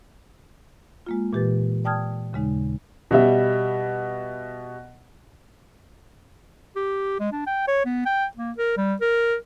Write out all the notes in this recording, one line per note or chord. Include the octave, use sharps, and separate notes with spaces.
G#3 A#3 F4
A#2 E3 G4 B4 A6
D5 G5 A5 D#6 F6 G#6
D#2 C#3 G#3 D#4
B2 G3 E5
G4
G#3
D4
G5
C#5
B3
G5
A#3
A#4
G3
A#4